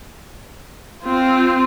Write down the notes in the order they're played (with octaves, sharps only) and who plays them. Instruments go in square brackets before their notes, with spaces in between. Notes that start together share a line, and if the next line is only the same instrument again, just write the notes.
[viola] C4 F4